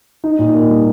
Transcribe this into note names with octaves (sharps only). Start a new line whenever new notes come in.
D#4
A#2
A#3
G3